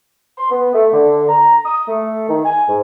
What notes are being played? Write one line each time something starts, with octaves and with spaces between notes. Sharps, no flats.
C6
B3
A3
D3
A#5
D#6
A3
D#3
G#5
G#2